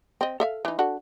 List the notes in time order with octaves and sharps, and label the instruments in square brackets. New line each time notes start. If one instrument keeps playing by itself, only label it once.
[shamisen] C4 D#5
A4 E5 F5
E3 D#4
D4 F#4 A4